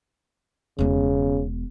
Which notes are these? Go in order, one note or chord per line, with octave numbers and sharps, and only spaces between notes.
E1 C#3 B3